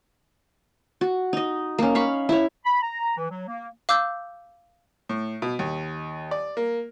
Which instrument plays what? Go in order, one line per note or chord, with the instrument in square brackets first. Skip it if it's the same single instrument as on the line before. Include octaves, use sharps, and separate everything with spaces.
[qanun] F#4
D#4 D#5
A#3 C#4
F5 B5 C#6
E4 C#5
[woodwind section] B5
A#5
E3
F#3
A#3
[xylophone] F5 D6 E6 G6
[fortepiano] A2
B2
D#2
D5
A#3